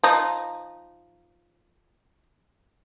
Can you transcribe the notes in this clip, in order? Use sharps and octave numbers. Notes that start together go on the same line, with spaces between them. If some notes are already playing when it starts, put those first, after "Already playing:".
F3 D#4